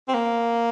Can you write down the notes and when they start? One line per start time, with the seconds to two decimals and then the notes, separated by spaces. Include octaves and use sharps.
0.08 C4
0.14 A#3